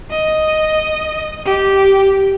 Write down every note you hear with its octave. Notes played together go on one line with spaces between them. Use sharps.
D#5
G4